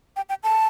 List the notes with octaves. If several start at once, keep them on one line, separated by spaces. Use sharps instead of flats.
G5
G5
A5